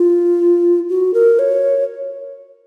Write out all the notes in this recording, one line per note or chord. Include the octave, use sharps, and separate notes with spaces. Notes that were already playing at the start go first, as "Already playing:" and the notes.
Already playing: F4
F#4
A#4
C#5